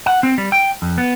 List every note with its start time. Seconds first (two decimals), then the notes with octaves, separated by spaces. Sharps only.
0.06 F#5
0.23 C4
0.38 G3
0.52 G5
0.82 F2
0.98 B3